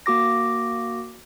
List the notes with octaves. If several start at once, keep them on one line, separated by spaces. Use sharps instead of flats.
A#3 F#4 D6 A#6